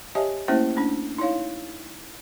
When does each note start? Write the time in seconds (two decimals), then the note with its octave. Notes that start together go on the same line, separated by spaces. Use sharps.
0.15 G4 C#5 D#5 E5 G#5 A5
0.48 A3 A#3 C#4 E4 C5 E5
0.75 A3 C#4 D4
1.18 D#4 E4 C#5 F5